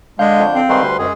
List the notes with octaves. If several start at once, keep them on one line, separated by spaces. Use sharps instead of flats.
D3 G#3 D4 F5 G6
F2 C#5
C4
G#2 D#3 G3 A3 B4 C6
D2 C5 G5
F#2 G#3 G#4